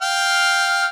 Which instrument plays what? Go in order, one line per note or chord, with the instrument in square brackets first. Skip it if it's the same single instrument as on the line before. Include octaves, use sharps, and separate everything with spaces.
[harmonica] F5 G5 F6